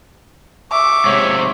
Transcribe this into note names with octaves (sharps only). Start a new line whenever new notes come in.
E5 C#6 D6
G#2 C3 C#5